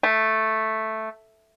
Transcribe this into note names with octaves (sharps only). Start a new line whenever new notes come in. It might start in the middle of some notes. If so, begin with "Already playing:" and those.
A3